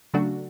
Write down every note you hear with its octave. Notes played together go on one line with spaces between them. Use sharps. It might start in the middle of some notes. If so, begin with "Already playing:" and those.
C#3 F#3 A3 D4 F#4